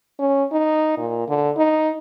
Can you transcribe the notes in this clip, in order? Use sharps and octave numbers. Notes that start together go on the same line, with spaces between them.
C#4
D#4
A#2
D3
D#4